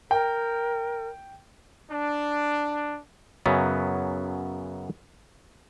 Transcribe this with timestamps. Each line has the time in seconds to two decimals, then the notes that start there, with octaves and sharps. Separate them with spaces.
0.11 A#4 G5
1.91 D4
3.46 F#2 C#3 F#3 B3